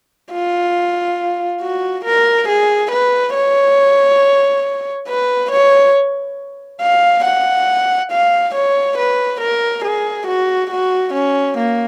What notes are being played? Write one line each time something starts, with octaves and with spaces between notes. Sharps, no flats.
F4
F#4
A#4
G#4
B4
C#5
B4
C#5
F5
F#5
F5
C#5
B4
A#4
G#4
F#4
F#4
C#4
A#3